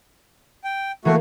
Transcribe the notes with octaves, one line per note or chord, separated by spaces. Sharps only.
G5
E3 A3 A#3 F#4